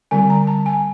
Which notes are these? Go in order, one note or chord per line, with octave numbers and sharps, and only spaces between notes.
D3 G3 C4 G#5
A#5
A5
G#5